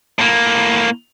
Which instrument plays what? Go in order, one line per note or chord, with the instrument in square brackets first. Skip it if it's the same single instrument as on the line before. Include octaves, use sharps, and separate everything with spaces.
[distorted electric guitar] A2 A#3